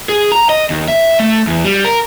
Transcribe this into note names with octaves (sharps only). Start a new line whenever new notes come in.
G#4
A#5
D#5
D#2
E5
A3
E2
G3
A#4